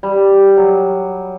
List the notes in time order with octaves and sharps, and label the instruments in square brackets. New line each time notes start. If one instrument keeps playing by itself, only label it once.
[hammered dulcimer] G3
F#3